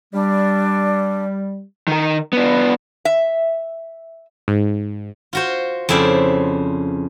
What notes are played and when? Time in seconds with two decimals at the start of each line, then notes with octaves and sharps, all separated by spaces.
0.14 G3 D4
1.88 D#3 A#4
2.33 B3 D4
3.05 E5
4.48 G#2
5.33 F4 F#4 C5
5.89 F2 C#3 E4 C5 D5